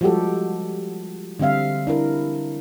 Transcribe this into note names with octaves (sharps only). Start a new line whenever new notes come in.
F3 G3 G#3 F#4 G4 A4
D3 G3 C4 E5 F5
D4 E4 A#4